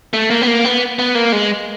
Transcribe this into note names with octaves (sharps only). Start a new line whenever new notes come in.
A3
A#3
B3
A#3
B3
B3
A#3
G#3